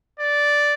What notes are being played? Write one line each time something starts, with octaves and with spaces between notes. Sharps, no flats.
D5